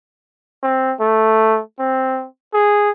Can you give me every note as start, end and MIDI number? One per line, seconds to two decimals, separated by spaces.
0.63 0.95 60
1.00 1.61 57
1.79 2.27 60
2.54 2.90 68